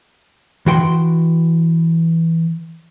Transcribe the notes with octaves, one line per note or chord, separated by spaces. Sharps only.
E3 F#4 G5 C6